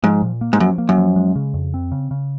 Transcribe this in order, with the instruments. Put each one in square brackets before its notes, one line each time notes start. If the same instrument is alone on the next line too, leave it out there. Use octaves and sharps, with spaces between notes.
[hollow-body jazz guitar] G#2 [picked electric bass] F3
[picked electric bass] A#2
A#3
[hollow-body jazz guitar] G#2
[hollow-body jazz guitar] F#2 [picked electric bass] F3
[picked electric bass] A#3
[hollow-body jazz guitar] F#2
[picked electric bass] F3
G#3
C#3
F2
C4
C#3
C#3